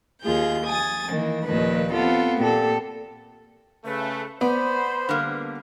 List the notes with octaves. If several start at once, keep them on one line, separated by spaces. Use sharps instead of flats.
D#2 F4 G#4 G6
G#5 D#6 A6
D#3 E3 A#3
D#2 A#2 D#3 F3 B4
B3 C4 F4 A4
A#2 G4 A4
C#3 A3 B4
B3 C5 D5 B5
D3 G3 A#3